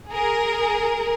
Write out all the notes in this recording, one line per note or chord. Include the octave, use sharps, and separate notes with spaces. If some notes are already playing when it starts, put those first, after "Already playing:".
G#4 A#4